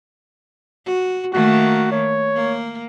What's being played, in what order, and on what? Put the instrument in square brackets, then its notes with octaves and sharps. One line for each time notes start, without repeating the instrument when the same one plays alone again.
[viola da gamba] F#4
[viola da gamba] D#3 A3 A#3 [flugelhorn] F#4
[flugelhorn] C#5
[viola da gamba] A#3